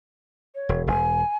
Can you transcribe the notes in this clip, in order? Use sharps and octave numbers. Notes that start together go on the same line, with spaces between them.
C#5
E1
E1 G#5